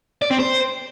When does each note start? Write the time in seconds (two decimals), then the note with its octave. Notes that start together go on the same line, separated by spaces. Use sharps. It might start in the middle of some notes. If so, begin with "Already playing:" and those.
0.22 D5
0.31 C4
0.39 C5